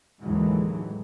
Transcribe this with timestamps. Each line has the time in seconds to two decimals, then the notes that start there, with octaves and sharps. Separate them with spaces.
0.20 A1 D#2 D3 E3 F#3 G#3